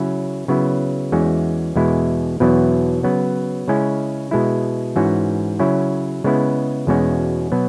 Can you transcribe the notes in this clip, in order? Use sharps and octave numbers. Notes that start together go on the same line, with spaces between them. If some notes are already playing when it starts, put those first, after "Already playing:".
Already playing: C#3 F#3 C#4 E4
C#3 F#3 B3 E4
E2 E3 G#3 C#4 F#4
E2 B2 G#3 E4
E2 B2 F#3 B3 E4
C#3 F#3 B3
C#3 G#3 C#4 E4
B2 G#3 E4
G#2 E3 C#4 F#4
C#3 F#3 C#4 E4
C#3 G#3 B3 E4
E2 B2 G#3 C#4 F#4
B2 F#3 B3